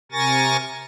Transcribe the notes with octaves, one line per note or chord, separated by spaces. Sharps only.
C3 A#4 G#5 C#6 A6 A#6